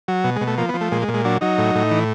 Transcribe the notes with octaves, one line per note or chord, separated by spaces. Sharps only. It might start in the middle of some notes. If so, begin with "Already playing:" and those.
F#3
B2
G#3
B2
A3
F3 A#3
B3
F3
A3
A#2 G#3
G#3
A#2
G#3
F#3 D4
F#3 D#4
A2
A2
E3